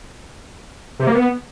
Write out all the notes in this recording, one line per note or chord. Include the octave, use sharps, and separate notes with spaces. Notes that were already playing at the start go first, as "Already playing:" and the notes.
C3
A#3
B3